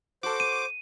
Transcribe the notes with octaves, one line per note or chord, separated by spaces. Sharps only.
F#4 A4 C5 D6
D#7